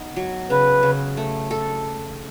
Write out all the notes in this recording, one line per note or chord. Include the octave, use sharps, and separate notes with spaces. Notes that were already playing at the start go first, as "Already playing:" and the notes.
Already playing: B3 D#4
F#3
C#3 B4
C#3
A3
A4